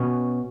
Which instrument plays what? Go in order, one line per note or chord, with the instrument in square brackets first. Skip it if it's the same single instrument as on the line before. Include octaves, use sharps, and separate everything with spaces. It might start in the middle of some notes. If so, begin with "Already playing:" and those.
Already playing: [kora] B2 C#4